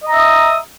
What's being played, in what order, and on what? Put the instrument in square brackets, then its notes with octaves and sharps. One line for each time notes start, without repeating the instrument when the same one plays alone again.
[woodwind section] D#5
A#5
E5
D#6